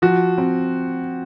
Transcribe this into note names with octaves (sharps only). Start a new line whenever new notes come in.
F3 F#4
C4